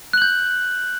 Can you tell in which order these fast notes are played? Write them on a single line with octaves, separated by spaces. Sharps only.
F#6 F#7 G6